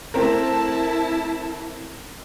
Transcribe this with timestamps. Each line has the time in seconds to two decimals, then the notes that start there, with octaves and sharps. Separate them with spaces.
0.14 A3 C4 E4 A#4 A5